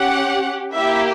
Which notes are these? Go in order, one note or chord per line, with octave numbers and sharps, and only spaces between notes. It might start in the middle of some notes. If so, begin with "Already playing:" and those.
Already playing: C#4 G4 F#5
A#3 E4 G4 E5